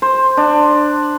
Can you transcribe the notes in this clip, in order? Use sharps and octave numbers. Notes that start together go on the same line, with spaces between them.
C5
D4